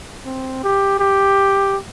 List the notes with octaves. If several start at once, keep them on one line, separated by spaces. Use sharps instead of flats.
C4
G4
G4